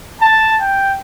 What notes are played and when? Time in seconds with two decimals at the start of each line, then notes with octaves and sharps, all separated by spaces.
0.20 A5
0.59 G5